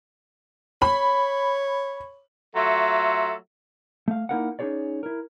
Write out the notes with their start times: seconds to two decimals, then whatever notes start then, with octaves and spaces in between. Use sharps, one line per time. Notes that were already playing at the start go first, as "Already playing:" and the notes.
0.82 C#5 B5
2.56 F#3 A3 F4 A4 E5
4.08 A3 F5
4.29 A#3 D#4 E4 A#4 F5 F#5
4.59 C#4 D#4 F#4 G#4 C#5 D5
5.03 E4 A#4